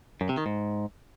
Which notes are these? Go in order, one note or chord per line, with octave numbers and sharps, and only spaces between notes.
F#2
C3
D#3
G#2